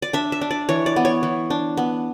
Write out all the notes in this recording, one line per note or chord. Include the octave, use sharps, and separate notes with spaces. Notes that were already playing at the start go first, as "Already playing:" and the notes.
D5
D4 E5
E5
D4
D5
E3 C#5
D5
B3
C#5
E3
D4
B3